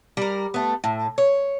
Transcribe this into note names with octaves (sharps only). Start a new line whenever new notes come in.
G3 A#4
A3 B3
A2
C#5